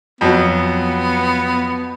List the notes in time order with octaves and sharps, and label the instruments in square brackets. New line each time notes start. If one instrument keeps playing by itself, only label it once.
[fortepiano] F2 F#3 [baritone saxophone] B3